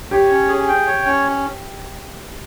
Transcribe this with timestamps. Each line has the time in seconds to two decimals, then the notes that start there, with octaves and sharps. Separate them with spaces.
0.11 G4 C#5
0.30 C#4
0.48 G#4
0.68 G5
0.87 C#5
1.06 C#4